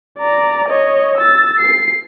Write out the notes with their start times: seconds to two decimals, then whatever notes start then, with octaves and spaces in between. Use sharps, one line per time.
0.19 D5 A#5
0.68 C#5 D#5
1.17 E6 A6
1.59 C7